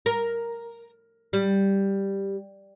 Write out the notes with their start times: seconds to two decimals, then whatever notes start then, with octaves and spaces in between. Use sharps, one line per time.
0.06 A#4
1.33 G3